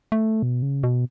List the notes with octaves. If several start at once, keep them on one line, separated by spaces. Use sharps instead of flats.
A3
B2
C#3
B2